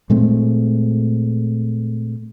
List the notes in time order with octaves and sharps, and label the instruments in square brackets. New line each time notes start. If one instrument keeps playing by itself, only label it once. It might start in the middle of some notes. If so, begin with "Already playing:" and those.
[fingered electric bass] A#2 G#3 A3 C4